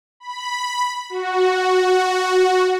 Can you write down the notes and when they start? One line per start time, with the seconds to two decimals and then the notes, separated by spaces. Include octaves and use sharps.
0.20 B5
1.10 F#4